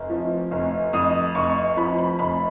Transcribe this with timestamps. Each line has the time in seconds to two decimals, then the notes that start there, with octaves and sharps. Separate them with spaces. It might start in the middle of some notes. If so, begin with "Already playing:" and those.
Already playing: F1
0.10 F3
0.51 F1
0.93 F2 D#6
1.35 F1 C#6
1.77 F3 B5
1.98 B5
2.19 F1 B5